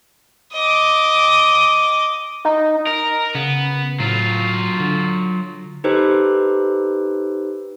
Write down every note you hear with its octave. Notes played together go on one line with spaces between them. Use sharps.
D#5 D6
D#4
A#4
C#3 B3
A2 F#3 F4
D3
D#4 G4 A4 B4 C5